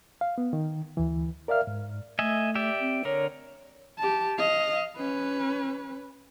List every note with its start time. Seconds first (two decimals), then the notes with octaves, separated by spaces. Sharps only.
0.21 F5
0.38 B3
0.53 D#3
0.97 D2 E3
1.48 A#4 D5 E5 F5 F6
1.67 G#2
2.19 A3 D#5 E5 G#5
2.55 G4 D5 E5
2.81 C4
3.05 D3 A#4 C#5
3.98 G4 A5
4.38 D#5 F5
4.97 C#4 B4